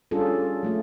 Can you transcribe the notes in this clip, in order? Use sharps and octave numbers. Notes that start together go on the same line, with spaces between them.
G3 C#4 D4 F4 G#4 A4
F#3 A3 F4